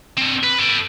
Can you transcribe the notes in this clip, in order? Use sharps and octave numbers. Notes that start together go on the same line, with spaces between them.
C4 D4
B4
A4 G5